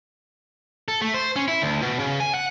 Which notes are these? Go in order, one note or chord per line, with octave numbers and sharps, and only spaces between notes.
A4
A3
C5
C#4
E4
D2
B2
C#3
G#5
F#5